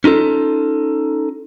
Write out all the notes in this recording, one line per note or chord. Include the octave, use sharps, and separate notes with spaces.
C#4 D#4 F4 A4